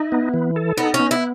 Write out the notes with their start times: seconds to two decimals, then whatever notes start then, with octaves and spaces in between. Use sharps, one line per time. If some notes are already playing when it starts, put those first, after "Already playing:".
Already playing: D#4 E4
0.12 B3
0.34 E3
0.56 A4
0.77 B3 D#4
0.94 C#4
0.99 B3
1.11 E4